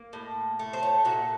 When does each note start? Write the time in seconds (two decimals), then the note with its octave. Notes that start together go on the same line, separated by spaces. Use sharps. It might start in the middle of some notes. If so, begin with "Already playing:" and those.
Already playing: A#3
0.13 A2
0.59 A3
0.73 C5
0.83 C#5
1.05 A#2 F#4